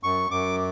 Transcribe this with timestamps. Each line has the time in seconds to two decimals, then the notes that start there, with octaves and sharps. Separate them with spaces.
0.03 F#2 C#6
0.31 F#2 D6